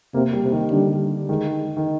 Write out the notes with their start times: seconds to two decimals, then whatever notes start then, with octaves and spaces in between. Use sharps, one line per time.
0.14 C3 A#3
0.33 G3
0.43 C3
0.52 D#3
0.71 D3 G3
1.29 D#3 G#3
1.77 D#3